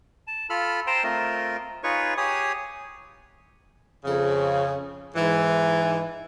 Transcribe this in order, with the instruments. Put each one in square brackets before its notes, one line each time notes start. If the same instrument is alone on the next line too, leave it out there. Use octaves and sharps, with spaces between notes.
[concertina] A5
F4 A4 B5 F6
C5 G5 A5 A#5 C6
A3 C4 F4 A#4 D#5
D#4 F4 G#4 B4 C#5 C#6
G4 G#4 C#5 G#5 D#6
[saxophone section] F2 C#3
G#2 E3